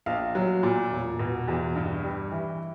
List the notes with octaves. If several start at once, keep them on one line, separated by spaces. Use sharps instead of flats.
A#1 F5
F#3
A#2
E1
B2
E2
G2
G3
E3